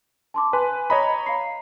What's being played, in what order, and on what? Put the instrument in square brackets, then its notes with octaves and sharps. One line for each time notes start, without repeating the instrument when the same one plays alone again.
[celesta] A5 C6 D6
[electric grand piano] B4 [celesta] G#5 C6
[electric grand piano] C#5 D#5 B5 [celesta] A#5
[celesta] F5 A#5 C7